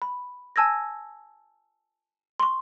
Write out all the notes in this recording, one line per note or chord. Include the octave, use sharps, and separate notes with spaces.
B5
G#5 A5 E6 G#6 A#6
C6 C#6